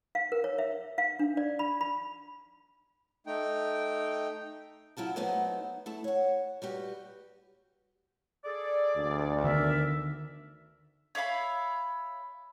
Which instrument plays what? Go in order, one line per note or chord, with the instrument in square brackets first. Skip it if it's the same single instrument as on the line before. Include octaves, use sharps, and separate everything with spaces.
[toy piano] F5
A#4
C#5
E5
F5
D4
D5
B5
B5
[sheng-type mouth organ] A3 D#4 G5
[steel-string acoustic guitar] F#3 E4 F4 A5
F#3 A3 B3 C4 D#4
A3 E4 A4
C#5 F#5
G3 F#4 G4 B4
[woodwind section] G#4 A4 D5
[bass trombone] D2
[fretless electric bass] D3 D#3 B3 [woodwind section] A#4 D5 E5
[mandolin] C#5 E5 F5 B5